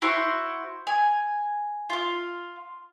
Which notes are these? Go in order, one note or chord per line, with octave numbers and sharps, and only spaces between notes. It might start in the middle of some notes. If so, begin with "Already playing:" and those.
E4 F#4 C5 C6
G#5
F4 F5